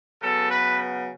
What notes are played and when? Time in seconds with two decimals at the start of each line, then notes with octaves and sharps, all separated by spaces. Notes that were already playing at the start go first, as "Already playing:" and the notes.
0.21 C#3 F#3 B3 A4
0.49 B4